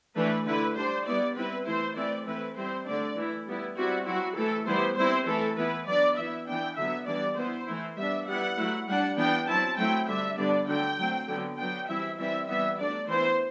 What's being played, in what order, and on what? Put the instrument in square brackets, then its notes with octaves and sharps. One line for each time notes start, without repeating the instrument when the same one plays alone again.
[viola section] E3 A3 D4 B4
D3 A3 E4 B4
G3 D4 C5
G3 B3 E4 D5
G3 C4 E4 B4
E3 A3 E4 C5
E3 A3 C4 E4 D5
E3 A3 C4 E4 B4
G3 C4 E4 C5
D3 A3 D4 D5
E3 A3 E4
G3 B3 E4
G3 C4 E4 F#4
F#3 C4 E4 F#4
E3 A3 E4 A4
E3 G3 B3 E4 C5
G3 C4 E4 C5
E3 A3 E4 A4
E3 B3 E4 B4
F#3 B3 D4 D5
E3 B3 E4 E5
E3 B3 D4 G5
D3 F#3 B3 E5
E3 G3 B3 D4 D5
E3 B3 E4 C5
E3 A3 E4
G3 B3 D4 E5
G3 B3 E4 F#5
F#3 A3 E4
G3 D4 F#5
E3 B3 D4 G5
F#3 C4 E4 A5
F#3 A3 C4 E4 G5
D3 G3 D4 E5
D3 G3 B3 D4 D5
D3 F#3 A3 D4 G5
F#3 A3 C4
D3 F#3 B3 D4
F#3 B3 D4 G5
E3 G3 C4 E4 E5
E3 G3 C4 E4 E5
E3 G3 B3 E5
F#3 A3 D4 D5
E3 B3 E4 C5